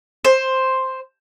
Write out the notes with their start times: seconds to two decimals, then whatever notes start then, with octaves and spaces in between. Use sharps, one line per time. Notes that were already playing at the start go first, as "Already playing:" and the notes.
0.25 C5